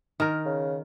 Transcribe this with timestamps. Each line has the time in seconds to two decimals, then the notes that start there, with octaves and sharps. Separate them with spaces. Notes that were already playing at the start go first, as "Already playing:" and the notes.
0.20 D#3 A#4
0.45 C#3